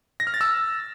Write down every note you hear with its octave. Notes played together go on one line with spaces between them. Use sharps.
A#6
F6
A6
E6